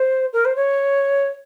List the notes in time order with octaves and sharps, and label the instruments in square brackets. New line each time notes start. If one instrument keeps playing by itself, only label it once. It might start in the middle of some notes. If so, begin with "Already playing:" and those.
Already playing: [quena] C5
A#4
C5
C#5